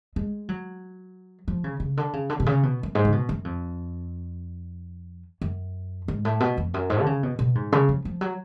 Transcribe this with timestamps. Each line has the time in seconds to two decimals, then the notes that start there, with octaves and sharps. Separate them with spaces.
0.16 G#3
0.49 F#3
1.48 F3
1.64 C#3
1.80 C#3
1.97 D3
2.13 C#3
2.29 D3
2.40 B2
2.46 C#3
2.63 B2
2.83 F#2
2.95 G#2
3.05 C#3
3.12 B2
3.29 F#2
3.44 F2
5.41 F#2
6.08 G#2
6.25 A2
6.40 B2
6.57 F2
6.74 F#2
6.90 G#2
7.01 D3
7.06 C#3
7.23 B2
7.39 B2
7.55 G#2
7.72 C#3
7.89 F3
8.05 F3
8.21 F#3